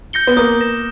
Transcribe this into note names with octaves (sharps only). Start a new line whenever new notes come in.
G6 A#6 C#7 G7
B3
A#3 D#6
A#6 E7